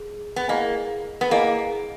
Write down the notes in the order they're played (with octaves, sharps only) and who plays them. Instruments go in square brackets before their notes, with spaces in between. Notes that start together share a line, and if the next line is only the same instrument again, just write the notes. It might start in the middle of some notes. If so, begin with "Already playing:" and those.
Already playing: [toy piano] G#4
[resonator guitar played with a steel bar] B3
[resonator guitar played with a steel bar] A#3 [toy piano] E4 G#4 D#5 G#5
[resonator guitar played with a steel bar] B3
[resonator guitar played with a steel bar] A#3 [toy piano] E4 G#4 D#5 G#5